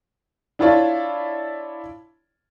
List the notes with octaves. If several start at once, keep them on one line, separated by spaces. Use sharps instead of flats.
D4 E4 F4 C#5 D5 A5